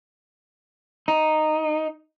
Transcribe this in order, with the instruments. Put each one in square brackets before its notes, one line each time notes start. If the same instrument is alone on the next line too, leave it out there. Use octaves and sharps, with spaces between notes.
[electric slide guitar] D#4